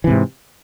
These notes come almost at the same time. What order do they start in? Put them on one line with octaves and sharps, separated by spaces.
E3 C3 G#2